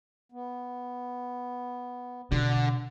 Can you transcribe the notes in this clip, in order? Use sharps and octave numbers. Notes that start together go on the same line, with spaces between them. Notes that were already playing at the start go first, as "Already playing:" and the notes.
B3
B2 D3